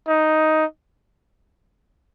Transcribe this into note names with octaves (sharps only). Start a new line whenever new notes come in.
D#4